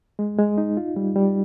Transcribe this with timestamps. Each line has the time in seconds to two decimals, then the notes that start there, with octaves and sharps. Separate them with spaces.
0.19 G#3
0.38 G#3
0.58 D#4
0.77 F4
0.96 G3
1.16 G3